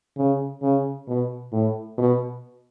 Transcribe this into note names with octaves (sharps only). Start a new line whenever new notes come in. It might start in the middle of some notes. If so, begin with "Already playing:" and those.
C#3
C#3
B2
A2
B2